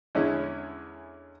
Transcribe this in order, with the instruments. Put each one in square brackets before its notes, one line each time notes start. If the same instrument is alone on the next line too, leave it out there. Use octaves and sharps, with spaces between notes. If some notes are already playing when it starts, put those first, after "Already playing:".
[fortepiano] E2 D3 G#3 C#4 E4